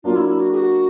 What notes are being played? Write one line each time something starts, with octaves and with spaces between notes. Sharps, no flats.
F#3 A#3 D4 F4
E4
E4
F#4
G#4
F#4